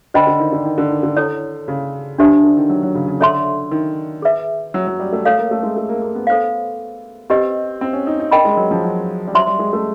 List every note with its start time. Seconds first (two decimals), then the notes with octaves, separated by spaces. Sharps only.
0.14 D3 C5 D#5 G5 B5
0.27 D3
0.40 D#3
0.52 D3
0.65 D#3
0.78 D3
0.91 D#3
1.03 D3
1.17 E4 A4 C#5
1.68 C#3
2.19 D3 D4 G4 C5 E5
2.44 D3
2.57 D#3
2.69 F#3
2.83 F#3
2.95 C#3
3.08 C#3
3.20 D3 A4 C#5 E5 A5 C6
3.71 D#3
4.22 G#4 B4 E5
4.74 F#3
4.87 F#3
5.00 G3
5.13 A3
5.25 A3 A4 C#5 F5
5.38 A#3
5.51 A3
5.63 G#3
5.77 A3
5.89 A#3
6.02 A#3
6.15 B3
6.27 A4 C5 F5
7.30 C4 G4 B4 D#5
7.81 C4
7.93 C#4
8.07 D#4
8.20 D#4
8.31 D4 A#4 D#5 G5 B5
8.45 G#3
8.57 F#3
8.71 F3
8.84 F#3
9.27 G3
9.34 F#3 C5 E5 A5 C6
9.47 G3
9.59 G#3
9.73 A3